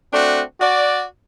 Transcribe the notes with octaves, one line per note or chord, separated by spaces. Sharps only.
A3 C4 D4 F#4
F#4 D5